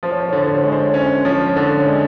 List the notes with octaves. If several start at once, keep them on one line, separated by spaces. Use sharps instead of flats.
F3 C5
C#5
C5
C#5
D3 C5
C#5
C5
G#3 C#5
C5
C#5
C5
C#4 C#5
C5
F3 C#5
D3 C#5
G#3 D5